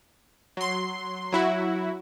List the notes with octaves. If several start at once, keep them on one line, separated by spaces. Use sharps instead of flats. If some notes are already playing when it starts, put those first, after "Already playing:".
F#3 C6
F#3 E4 F#4